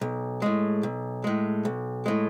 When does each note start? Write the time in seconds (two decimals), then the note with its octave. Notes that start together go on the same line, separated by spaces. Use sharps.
0.01 B1
0.42 A2 G#3
0.83 B1
1.24 A2 G#3
1.65 B1
2.06 A2 G#3